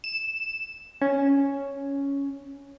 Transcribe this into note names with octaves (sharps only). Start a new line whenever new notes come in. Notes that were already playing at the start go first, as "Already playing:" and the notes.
E7
C#4